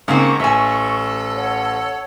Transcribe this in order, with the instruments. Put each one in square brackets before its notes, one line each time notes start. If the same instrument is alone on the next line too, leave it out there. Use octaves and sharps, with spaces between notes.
[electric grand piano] G#2 [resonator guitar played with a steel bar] C#3 A#3 C4 [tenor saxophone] A#4 [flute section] C#6
[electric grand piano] A1 [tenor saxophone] A4 [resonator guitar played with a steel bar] E5 G#5
[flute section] C#5 F#5